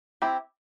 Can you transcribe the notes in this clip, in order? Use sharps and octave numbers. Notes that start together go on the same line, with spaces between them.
C4 E4 G4